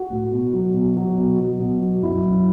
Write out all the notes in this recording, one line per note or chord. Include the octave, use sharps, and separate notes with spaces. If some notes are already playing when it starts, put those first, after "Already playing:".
Already playing: F#4
A2
B2
F#3
B2
F#3
B2
F#3
B2
F#3
F#2 E4
F#2